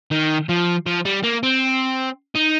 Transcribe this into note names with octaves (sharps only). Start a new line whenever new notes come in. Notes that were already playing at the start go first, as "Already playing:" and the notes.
D#3
F3
F3
G3
A#3
C4
D#4